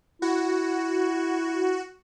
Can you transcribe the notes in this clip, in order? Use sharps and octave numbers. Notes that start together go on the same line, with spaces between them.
E4 F#4